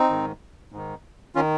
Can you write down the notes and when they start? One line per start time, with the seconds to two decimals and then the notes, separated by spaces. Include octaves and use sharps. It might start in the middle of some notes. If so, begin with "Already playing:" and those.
Already playing: C4 D#4
0.10 G#2 D#3
0.72 G#2 D#3
1.35 D#3 C#4 F4